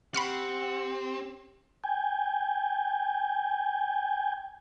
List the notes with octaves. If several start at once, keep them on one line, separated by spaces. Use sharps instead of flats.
C4 G4 F#5 B5 C#6 F6
G5 G#5